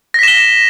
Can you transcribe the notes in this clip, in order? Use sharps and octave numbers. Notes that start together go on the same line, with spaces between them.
A#6 B6 E7 G7